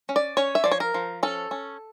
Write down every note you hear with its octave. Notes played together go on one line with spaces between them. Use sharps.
C#4
D5
C#4 C#5
E5
F3 D5
C#5
A#4
F3
C#4 A4
C#4